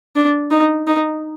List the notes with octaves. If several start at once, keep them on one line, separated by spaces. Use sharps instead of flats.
D4
D#4
D#4